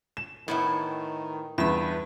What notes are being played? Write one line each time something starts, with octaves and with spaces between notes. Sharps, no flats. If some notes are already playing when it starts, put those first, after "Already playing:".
E7
A2 D#3 B3 E4
E2 G2 B4 E5 B5